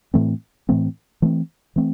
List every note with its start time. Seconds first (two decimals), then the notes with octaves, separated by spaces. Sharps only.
0.14 A2 E3 A3 C4
0.69 A2 E3 A3 C4
1.22 E3 A3 C4
1.76 E3 A3 C4